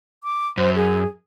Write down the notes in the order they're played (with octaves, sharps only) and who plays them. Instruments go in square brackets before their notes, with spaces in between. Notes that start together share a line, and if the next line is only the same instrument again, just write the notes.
[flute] D6
[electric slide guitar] F#2 [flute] C5
[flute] G#4